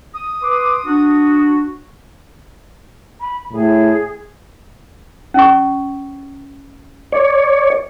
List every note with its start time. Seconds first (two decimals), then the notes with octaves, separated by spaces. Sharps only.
0.14 D#6
0.42 B4 C6 D6
0.85 D4 F#4
3.21 B5
3.53 A2 G#4
5.34 C#4 C#6
7.12 C#5 D5